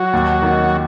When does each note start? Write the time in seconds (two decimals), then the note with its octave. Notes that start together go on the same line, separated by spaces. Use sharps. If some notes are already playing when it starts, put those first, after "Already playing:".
Already playing: F#3 F#4
0.13 D#2
0.42 D#3 A#3